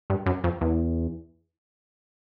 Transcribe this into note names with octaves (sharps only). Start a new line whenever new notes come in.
G2
F#2
F2
E2